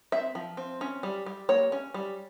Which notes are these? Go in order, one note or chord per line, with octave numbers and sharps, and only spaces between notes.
C4 E5
F3
C4
C#4
G3
G3
A#3 C#5
C#4
G3